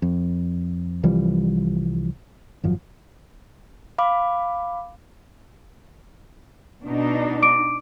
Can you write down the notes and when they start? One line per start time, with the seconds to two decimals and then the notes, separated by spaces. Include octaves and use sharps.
0.02 F2
1.03 C2 E3 F3 G3
2.64 G#1 F#2 F3
3.98 F5 B5 D6
6.85 B2 D4 D#4
7.42 D6 D7